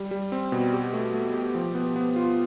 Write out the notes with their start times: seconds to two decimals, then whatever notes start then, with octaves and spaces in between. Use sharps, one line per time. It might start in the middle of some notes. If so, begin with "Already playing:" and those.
Already playing: G3
0.11 G3
0.32 C4
0.52 B2
0.73 G4
0.93 A3
1.14 A3
1.34 G4
1.55 F3
1.75 B3
1.96 B3
2.16 F4